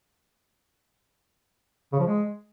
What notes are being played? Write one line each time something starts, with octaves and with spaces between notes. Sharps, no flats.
C#3
F3
G#3